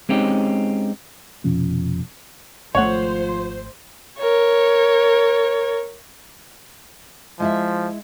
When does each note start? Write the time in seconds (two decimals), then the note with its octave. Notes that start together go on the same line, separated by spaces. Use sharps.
0.09 G#3 C4 C#4 D#4 G4
1.44 F1 B2 F3 C#4
2.75 G#1 F3 A3 C5 C#5 F#5
4.18 A#4 C#5
7.40 F3 G#3 E4 E5